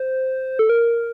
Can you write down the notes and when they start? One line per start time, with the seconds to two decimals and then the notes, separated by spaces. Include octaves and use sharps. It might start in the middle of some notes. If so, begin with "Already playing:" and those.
Already playing: C5
0.59 A4
0.69 A#4